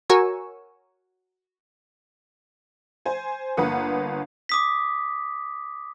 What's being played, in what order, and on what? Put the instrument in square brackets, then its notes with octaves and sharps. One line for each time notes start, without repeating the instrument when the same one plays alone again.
[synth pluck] F#4 A#4 C#5 G#5 C#6 E6
[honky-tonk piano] C5 G#5
G1 A#3 B4 F#5 D#6
[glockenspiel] D6 D#6 B6